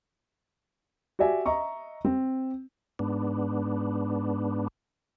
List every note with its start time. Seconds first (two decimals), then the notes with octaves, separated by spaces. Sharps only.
1.19 F#4 G4 D5 E5 G#5
1.46 D#5 E5 A#5 C#6
2.05 C4
2.99 G#2 B3 D4